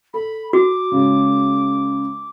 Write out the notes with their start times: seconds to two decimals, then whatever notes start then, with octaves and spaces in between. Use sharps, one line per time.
0.14 A4 B5
0.53 F#4 D6
0.92 C#3 G#3